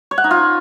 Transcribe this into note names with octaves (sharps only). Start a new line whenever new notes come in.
C#5
F#5
D#4
F4